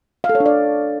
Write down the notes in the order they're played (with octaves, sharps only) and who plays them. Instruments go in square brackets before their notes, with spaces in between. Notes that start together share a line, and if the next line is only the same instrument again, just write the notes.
[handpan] F5
A4
C#5
D4
D5